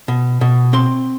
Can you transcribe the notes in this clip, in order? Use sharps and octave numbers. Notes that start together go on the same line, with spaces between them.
B2
B2
C4 C6